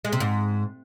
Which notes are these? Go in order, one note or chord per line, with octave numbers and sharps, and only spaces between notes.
G#3
C3
G#2